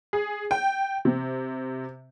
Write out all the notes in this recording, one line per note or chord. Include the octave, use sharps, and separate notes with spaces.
G#4
G5
C3